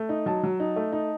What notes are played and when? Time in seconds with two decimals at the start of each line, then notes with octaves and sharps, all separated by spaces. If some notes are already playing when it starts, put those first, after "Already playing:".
Already playing: A3
0.09 D#4
0.26 F#3 A5
0.43 F#3
0.60 D#4
0.76 A3
0.92 D#4